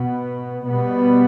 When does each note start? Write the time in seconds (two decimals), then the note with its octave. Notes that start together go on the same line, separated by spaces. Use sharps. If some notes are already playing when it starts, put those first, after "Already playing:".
Already playing: B2 B3
0.67 B2 G3 B3